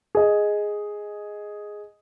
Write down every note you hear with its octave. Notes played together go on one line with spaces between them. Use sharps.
G#4 D#5